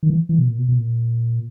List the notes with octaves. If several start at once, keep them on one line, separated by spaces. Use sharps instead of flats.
D#3
E3
E3
B2
A#2
B2
B2
A#2